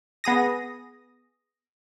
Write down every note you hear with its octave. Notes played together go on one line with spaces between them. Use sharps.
B3 G#4 D#6 A#6